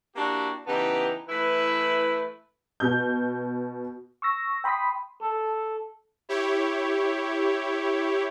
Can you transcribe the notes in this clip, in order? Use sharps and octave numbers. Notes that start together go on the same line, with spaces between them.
A#3 D4 E4 F#4 G4
C#3 E3 B3 D#4 G4 A5
E3 A3 E4 B4
B2 G6
C#6 E6 A#6
G5 B5 C6 D#6 B6
A4
E4 G4 C#5